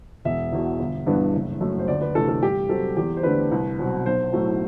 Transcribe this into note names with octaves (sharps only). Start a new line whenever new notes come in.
E1 E5
E2 B2
G1
G2 E3 B3 D4
F#1
F#2 F#3 A3
C5
D2 D5
B4
C3 E3 A3 D4 A4
A4
G2 G4
F#3 C4 A4
E2 G4
C5
D3 A3 D4 B4
C2
B2 F#3 C4
B1 C5
A2 F#3 A3 C4